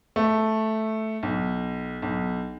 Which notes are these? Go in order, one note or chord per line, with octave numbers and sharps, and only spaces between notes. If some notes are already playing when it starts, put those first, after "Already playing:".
A3
B1
B1